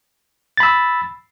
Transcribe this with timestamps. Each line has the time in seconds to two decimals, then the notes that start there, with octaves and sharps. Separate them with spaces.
0.57 A6
0.60 B5
0.63 E6